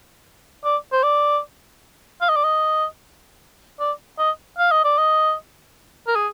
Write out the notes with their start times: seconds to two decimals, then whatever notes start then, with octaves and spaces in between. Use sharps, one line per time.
0.64 D5
0.92 C5
1.03 D5
2.22 F5
2.29 D#5
2.36 D5
2.44 D#5
3.80 D5
4.19 D#5
4.59 F5
4.72 D#5
4.84 D5
4.98 D#5
6.08 A#4
6.16 G#4